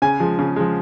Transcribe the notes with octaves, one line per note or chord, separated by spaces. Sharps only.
C#3 G#5
F3 G#3
C#3
F3 G#3